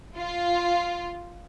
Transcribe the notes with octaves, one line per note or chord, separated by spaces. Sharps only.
F4